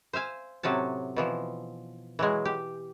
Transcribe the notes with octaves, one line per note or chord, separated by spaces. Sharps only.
C5 E5 F5 G#5
A2 C3 F#3 C#4 A5
B2 E3 F3
E3 F#3 G#3
G4